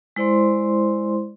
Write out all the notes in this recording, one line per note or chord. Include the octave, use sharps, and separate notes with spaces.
G#3 E4 C5 D5 C6